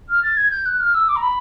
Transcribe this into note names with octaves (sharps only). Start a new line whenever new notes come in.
F6
A6
G#6
G6
F#6
F6
E6
D6
A#5
B5